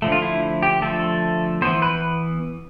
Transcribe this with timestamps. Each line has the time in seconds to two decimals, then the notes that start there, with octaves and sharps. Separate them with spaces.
0.02 D3 F3 A3
0.12 F4
0.22 E4
0.63 G4
0.82 D3 F3 A3 A4
1.62 E3 B3 C5
1.82 B4